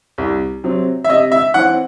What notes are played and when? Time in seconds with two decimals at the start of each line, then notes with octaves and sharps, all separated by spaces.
0.18 C2
0.64 C3 F#3 C4
1.04 E5
1.09 C3 D#5
1.32 E5
1.54 E3 C4 F#5